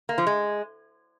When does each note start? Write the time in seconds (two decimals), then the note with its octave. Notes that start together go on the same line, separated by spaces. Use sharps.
0.09 A#3
0.18 F3
0.27 G#3